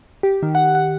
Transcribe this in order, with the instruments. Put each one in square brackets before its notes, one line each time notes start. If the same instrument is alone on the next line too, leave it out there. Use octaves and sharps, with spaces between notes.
[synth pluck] G4
D#3
F#5
F#5